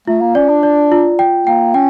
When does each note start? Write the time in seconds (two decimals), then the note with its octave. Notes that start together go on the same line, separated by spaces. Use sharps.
0.08 A3 F4
0.21 A#3
0.35 C#4 D5
0.49 D4
0.63 D5
0.92 F4
1.19 G5
1.47 A#3 G5
1.74 C#4 G5